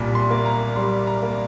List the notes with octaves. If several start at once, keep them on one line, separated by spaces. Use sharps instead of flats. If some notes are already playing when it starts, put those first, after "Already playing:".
Already playing: C2 A#2 G3
C6
A#3
A#5
G3 C6
A#5
A#3